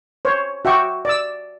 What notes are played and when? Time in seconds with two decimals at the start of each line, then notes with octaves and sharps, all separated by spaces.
0.25 C5 C#5
0.65 F#4 E5 G5 C#6 D6
1.05 D5 E6